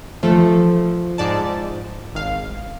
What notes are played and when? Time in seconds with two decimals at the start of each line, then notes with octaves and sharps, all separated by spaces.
0.23 F3 A3 A4
1.18 G#2 D5 A5
2.15 G#1 F5